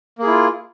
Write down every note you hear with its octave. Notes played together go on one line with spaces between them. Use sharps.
A#3 E4 F4 G#4